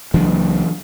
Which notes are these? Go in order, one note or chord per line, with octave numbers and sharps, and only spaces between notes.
C#2 E3 F#3 A#3 D4